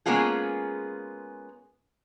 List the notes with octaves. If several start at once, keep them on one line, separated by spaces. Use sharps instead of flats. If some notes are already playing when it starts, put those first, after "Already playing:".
G#3 A#3 B3 C#4 F4 G#4